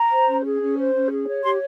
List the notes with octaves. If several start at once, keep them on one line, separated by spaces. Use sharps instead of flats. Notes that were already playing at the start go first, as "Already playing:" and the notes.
Already playing: A#5
C5
C#4
G#4
C#4
C5
C#4
G#4
C#5
G4 C6